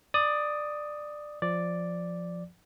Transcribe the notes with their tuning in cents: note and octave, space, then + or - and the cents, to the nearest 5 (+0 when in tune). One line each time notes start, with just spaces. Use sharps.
D5 +15 D#6 +0
F3 +0 D5 +0